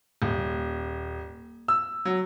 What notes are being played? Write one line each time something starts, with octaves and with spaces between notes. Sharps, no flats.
D#1
E6
F#3